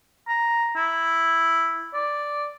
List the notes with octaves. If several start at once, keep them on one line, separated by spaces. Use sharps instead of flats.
A#5
E4
D5